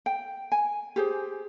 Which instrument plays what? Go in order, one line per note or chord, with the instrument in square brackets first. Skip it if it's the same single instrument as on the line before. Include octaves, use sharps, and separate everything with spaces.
[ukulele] G5
G#5
G4 G#4 C5